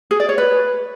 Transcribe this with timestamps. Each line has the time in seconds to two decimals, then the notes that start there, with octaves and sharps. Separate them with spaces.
0.11 G#4
0.20 D5
0.29 C#5
0.38 B4